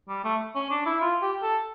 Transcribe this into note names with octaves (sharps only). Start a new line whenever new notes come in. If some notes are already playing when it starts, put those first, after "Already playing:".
G3
A3
C#4
D4
E4
F4
G4
A4